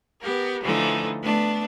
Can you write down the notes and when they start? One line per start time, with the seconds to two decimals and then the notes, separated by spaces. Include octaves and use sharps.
0.22 B3 G4 A#4
0.62 D3 E3 F3 A3 D#4
1.22 A3 B3 D4